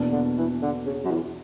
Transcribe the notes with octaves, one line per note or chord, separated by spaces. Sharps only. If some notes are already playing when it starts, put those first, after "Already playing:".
Already playing: E2 B2 A#3 D4
D3
E3
D3
C#3
F#2
E2